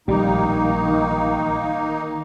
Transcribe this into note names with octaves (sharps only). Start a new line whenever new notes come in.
A#1 A2 D#3 G3 A#3 D#4